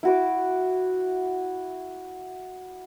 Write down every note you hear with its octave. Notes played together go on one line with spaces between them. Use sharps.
E4 F#4 D6